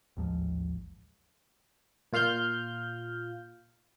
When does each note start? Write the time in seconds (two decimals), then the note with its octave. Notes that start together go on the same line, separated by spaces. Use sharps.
0.17 A1 D#2 G#2 F3
2.13 A#2 F4 F5 F6 G6